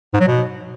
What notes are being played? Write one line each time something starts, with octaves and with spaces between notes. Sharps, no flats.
G#2
F#3
B2